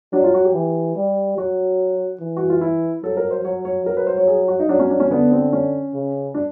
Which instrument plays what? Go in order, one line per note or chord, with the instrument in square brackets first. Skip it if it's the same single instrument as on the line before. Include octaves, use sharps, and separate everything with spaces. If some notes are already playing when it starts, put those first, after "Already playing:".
[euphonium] F#3 [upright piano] D4
[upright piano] F4
F#4
G4
[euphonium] E3
G3
[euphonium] F#3 [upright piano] F#4
[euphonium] E3
[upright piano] F#4
F4
E4
[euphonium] F#3 [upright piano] A4
[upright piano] A#4
C5
[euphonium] F#3 [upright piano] C#5
[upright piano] C#5
[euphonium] F#3 [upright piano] A#4
[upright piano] B4
C5
C#5
G#4
F#4
D#4
[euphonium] F#3 [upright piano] D4
[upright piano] C#4
D4
C#4
[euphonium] D3 [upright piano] B3
[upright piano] C4
C#4
[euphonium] C#3
[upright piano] D4